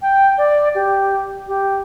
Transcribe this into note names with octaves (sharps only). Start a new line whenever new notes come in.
G5
D5
G4
G4